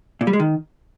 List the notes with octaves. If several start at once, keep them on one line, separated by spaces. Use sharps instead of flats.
A#2
G3
G#3
D#3